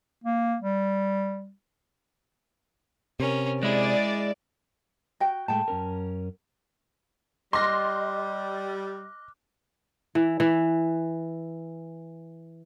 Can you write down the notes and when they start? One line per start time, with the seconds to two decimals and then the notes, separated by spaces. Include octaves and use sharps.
0.24 A#3
0.62 G3
3.20 C3 C#4 A#4
3.63 G#3 E4 G#4 D5
5.20 F#4 G5
5.48 A2 G#3 A3 G5 A5
5.68 F#2 C#4 A#4
7.53 G3 D#5 C6 D6 F6 F#6 A#6
10.15 E3
10.40 E3